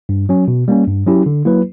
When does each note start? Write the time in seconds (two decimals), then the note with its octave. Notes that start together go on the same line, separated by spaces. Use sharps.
0.09 G2
0.29 F#3 C#4
0.48 B2
0.68 G3 A#3 C#4
0.87 G2
1.06 F#3 C#4 E4 G4
1.26 D3
1.45 F#3 A#3 E4 B4